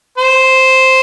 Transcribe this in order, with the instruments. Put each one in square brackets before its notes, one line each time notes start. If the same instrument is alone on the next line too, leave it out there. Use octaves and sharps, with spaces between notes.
[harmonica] C5